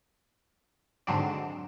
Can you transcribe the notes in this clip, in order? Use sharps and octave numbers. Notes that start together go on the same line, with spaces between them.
G#2 D3 F#3 C4 D4